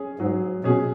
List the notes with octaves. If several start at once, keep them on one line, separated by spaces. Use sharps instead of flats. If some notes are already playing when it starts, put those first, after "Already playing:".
Already playing: C#4 G#4
G#2 F#3
B2 C#4 G#4